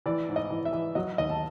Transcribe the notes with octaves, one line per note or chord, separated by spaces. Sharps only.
E3 D5
G#2
D#5
E3
E5
E3
F#3 D#5
D#2 D#5
A5